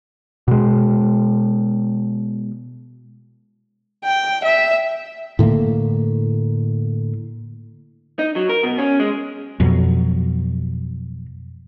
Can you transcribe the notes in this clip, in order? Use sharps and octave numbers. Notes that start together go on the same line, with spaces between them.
B2 G#3
G5
E5
A2 D3 A3 A#3
D#4
F#3
A#4
B2
C#4
G#3
F2 B2 F#3